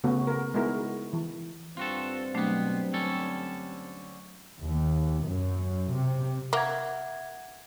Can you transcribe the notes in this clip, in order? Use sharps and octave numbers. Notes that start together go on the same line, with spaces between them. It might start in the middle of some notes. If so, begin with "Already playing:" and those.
C#3 A3 B3 F#4
A#4
G#3 B3 D#4 E4 F#4 A#4
E3
G2 C4 F4 F#4 A4
B2 F#3 A3 B3 D4
D3 C#4 A4
D#2
F#2
C3
A#3 E5 F#5 G#6